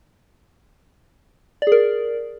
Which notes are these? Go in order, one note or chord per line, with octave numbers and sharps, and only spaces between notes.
G#4 A#4 D5